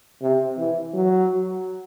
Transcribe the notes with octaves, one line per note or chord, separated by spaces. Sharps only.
C3
E3
F#3